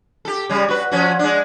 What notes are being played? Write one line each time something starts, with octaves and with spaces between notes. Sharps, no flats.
G4 A4
C#3 G3
F#4 B4
F3 C#4 F#4
G#3 D4